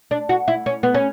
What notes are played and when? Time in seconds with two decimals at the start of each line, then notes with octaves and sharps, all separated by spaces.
0.11 D4
0.29 F#4
0.48 E4
0.66 C#4
0.83 B3
0.94 C#4